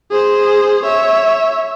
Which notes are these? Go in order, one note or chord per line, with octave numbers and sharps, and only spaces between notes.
G#4 C5
C#5 E5